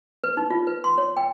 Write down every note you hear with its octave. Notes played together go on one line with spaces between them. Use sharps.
B4
D#4
F4
B4
C6
C#5
G5